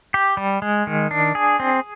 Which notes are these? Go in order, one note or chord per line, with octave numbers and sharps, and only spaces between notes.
G4
G3
G#3
D#3
D4
G#4
C4